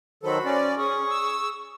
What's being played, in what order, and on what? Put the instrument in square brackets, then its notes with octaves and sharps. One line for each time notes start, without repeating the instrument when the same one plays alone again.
[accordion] D#3 F#3 A4 [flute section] F#4 C5 B5
[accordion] C#4 D5
[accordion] C#4 [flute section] G#4 C#6 D#6
[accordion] E6